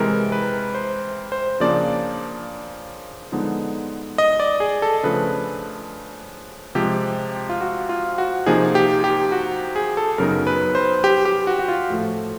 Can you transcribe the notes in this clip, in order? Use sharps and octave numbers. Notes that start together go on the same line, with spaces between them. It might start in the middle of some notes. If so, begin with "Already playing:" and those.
Already playing: C3 E3 G#3 A#4
B4
C5
C5
C#3 F3 A#3 D4 D5
D3 F3 G#3 B3 D#4
D#5
D5
G#4
A4
C#3 F3 A3 D4 B4
C3 F3 G#3 G4
F4
F#4
F4
F#4
C3 F3 A#3 D#4 G#4
G4
G4
F#4
G#4
A4
F#2 C#3 F#3 B3 D#4 A#4
B4
C5
G4
G4
F#4
F#4
F4
A2 F3 A3